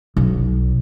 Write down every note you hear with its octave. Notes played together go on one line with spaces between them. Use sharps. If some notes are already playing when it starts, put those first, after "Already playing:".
B1